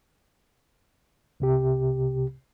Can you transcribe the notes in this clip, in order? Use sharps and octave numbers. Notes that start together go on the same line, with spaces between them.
C2 C3 G4